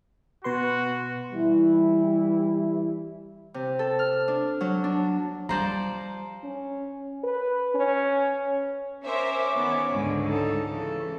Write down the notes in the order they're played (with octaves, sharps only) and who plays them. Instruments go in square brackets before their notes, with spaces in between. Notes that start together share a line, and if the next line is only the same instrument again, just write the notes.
[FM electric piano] B2 B4 C6 [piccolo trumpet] F#4
[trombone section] E3 G3 E4
[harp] C3
A4
F6
D4
F#3
D4
[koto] F3 C5 D5 [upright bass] G3 [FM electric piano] A#5
[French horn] C#4
B4
C#4
[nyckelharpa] C#4 D6 [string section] A#4 C5 E5
[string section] D#3 B3
C#2 G#2 D3
[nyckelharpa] D#4 A4
[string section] C#3 E3 [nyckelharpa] A4